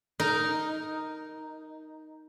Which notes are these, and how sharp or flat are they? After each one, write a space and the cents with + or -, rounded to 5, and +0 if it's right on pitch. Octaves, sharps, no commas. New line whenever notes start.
D#4 +0 A#4 +0